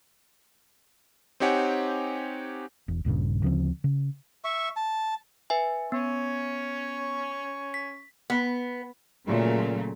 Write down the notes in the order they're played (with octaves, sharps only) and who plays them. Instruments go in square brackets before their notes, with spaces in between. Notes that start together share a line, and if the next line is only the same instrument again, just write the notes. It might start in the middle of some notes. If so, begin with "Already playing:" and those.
[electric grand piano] C4 D#4 G4 C#5 F#5 G#5
[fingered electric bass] E1
D#1 A#1 G2 C#3
D2 C#3 F3 C4
C#3
[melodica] E5 C#6
A5
[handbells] B4 E5 G#5
[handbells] B3 [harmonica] C#4 C#6
[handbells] B6
[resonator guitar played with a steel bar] B3
[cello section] A#2 C#3 F#3 A3